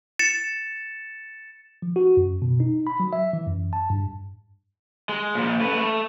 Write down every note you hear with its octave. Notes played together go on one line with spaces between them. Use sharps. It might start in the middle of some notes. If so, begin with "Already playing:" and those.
A6 C#7 E7
F3
F#4
F#2
B2
D#4
B5
F#3
E5
E3
F#2
A5
G2
G#3
A#2 F3
A3 B4
A3